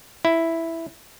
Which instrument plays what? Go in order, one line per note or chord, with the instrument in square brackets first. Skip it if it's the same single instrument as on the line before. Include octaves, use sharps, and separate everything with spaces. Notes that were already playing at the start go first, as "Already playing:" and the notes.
[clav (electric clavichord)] E4